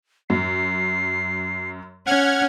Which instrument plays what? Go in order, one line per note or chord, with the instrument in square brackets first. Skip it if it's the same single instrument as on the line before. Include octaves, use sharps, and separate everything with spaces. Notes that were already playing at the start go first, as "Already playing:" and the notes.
[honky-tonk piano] F#2 [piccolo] C7
[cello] C#4 [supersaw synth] F#5 F6 G#6